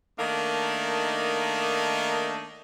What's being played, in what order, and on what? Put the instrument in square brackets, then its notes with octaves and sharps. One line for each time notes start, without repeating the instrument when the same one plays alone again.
[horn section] D#3 A3 A#3 D4 D#4